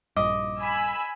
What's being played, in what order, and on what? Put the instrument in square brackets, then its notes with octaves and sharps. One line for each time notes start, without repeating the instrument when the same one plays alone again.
[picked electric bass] A#1 G2 [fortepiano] D#5 [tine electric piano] D6
[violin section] G#5 B5 E6